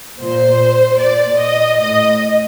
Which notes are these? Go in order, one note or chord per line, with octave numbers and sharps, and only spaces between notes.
A#2 C5
A#2 D5
D#5
A2 D#5